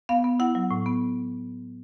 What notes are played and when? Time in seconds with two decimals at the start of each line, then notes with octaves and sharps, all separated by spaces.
0.09 B3 F5
0.24 B3
0.40 E4 F#5
0.55 F#3
0.71 A2
0.86 B3